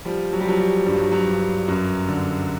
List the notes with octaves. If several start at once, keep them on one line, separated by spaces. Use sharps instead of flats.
F3 G3
F#3
G3
F3 F#3
G3
G2 G3
F#3
F#3
G2
F#2
D3